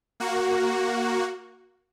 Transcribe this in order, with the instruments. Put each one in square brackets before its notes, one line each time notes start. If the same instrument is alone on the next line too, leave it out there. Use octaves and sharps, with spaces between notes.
[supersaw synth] A#3 F#4